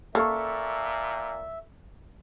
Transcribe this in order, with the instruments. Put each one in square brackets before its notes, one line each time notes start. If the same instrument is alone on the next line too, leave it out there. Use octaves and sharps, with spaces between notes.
[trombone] A#2 [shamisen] A#3 [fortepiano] A4 C#6 [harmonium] E5